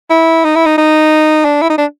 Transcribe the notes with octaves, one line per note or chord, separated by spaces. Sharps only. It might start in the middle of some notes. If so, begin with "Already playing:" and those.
E4
D#4
E4
D#4
D#4
D4
E4
D#4
D4